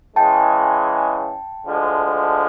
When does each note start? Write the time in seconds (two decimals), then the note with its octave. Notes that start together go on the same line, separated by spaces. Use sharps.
0.16 C#3 E3 G#3 G5 A5
1.64 D2 D3 F3 G#3